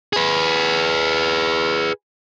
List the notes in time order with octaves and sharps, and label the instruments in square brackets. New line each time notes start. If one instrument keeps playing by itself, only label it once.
[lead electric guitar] G#4 B4